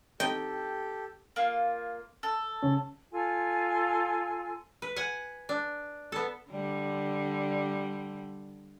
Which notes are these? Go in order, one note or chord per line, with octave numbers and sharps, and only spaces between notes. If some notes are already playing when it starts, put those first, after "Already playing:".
C4 D#4 G4 A4 D#5 G5
A#3 F4
A4
C#3 C#4
F4 A4 G#5
B4
F#5 G#5
D4
B3 A4
D3 G3